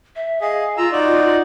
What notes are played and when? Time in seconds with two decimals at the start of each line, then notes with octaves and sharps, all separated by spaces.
0.16 E5
0.41 G#4 D#5 F5
0.77 F4 A#5 E6
0.92 D#4 F#4 D5